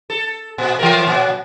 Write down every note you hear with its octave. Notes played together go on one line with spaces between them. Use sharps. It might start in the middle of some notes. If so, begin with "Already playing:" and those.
A4
A#2
E3 A3 A#4
A#2 F#3